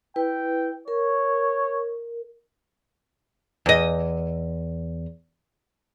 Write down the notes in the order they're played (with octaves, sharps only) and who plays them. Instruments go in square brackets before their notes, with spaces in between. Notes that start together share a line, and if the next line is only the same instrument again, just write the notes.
[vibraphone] E4 B4 [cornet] G5
[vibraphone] A#4 [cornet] C#5
[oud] E2 D#5